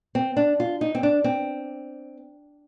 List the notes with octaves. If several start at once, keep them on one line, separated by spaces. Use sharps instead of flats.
C4
D4
F4
D#4
C4
D4
C4